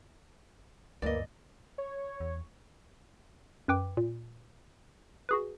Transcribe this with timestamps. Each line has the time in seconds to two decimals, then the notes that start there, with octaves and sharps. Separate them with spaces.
1.02 D2 G2 E3 A#3 D5 D#5
1.78 C#5
2.20 E2
3.68 F#2 B4 G5 D6
3.97 A#2
5.29 F#4 G#4 B4